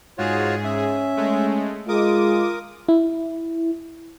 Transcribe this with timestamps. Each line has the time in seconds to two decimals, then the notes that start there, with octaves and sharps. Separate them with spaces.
0.18 G#2 F4 F#4 G#4 C#5
0.64 C#4 E5
1.17 G#3 A3
1.88 G#3 F4 A#4 D6 D#6
2.89 E4